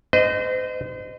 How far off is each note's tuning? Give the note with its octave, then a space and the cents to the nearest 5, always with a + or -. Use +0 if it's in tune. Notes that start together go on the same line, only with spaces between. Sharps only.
C5 -40 D#5 -10